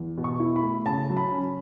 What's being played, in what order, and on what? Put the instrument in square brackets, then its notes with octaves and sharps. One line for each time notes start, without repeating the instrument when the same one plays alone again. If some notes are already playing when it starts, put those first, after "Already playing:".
Already playing: [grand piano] E2
B2
C#6
E4
B5
A3
C#3 A5
F#3
B5
C#4